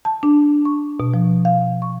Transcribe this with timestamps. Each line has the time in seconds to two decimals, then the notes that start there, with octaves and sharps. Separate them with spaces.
0.05 A5
0.23 D4
0.65 C#6
1.00 B2
1.14 F3
1.45 F5
1.82 C#6